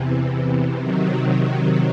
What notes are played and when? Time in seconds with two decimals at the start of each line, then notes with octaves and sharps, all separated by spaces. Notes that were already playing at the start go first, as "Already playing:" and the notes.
Already playing: E2 C3 E3
0.76 C3 D#3 F#3